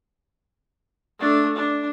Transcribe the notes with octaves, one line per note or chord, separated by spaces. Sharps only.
A3 D4
D4